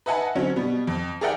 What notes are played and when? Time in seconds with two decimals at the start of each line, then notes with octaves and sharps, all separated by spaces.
0.06 B4 D#5 E5 F#5 G#5 A5
0.35 D3 F#3 C4 C#4
0.56 B2 G3 B3
0.87 F2
1.21 G#4 A#4 D5 E5 F#5 G5